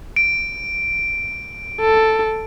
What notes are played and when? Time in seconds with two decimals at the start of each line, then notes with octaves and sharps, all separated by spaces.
0.16 D7
1.81 A4